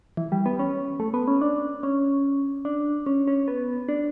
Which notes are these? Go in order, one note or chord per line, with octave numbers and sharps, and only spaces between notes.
E3
G3
B3
C#4
A3
B3
C#4
D4
C#4
D4
C#4
C#4
B3
D4